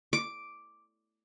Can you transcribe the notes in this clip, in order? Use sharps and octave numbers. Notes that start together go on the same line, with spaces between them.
D6